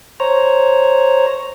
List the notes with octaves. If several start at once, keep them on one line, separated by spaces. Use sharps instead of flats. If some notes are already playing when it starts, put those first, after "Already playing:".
C5 C#5 A#5